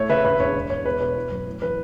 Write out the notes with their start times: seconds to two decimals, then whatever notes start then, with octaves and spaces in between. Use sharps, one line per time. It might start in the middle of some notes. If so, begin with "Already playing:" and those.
Already playing: A2 A3 C#5
0.09 C#3 B4 E5
0.25 E1 B4 E5
0.39 E1 C#5
0.55 E1
0.70 E1 C#5
0.85 B3 B4
1.00 B2 B4
1.16 E4
1.31 F#2
1.47 A2
1.62 E3 B4